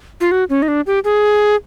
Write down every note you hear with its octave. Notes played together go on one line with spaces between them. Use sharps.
F4
F#4
C#4
D#4
D4
G4
G#4